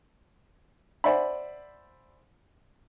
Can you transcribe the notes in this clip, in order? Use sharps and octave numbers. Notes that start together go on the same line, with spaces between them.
C5 D5 E5 F#5 G#5 B5